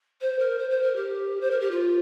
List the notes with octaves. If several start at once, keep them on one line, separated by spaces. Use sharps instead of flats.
C5
A#4
C5
C5
A#4
G4
C5
A#4
G4
F4